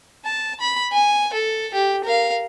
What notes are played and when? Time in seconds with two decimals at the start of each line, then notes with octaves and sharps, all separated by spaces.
0.25 A5
0.60 B5
0.92 G#5
1.33 A4
1.74 G4
2.04 A#4 F5